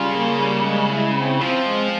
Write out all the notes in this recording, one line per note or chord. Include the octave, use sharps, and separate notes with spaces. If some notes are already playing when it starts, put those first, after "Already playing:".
Already playing: C#3 G3 F4
A#3
G3
G#3
E4
C4
F3 C4
G#3